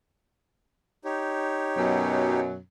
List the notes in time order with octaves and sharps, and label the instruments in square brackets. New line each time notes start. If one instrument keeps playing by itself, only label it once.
[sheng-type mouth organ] D#4 G4 C#5
[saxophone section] F#2 B2 F#3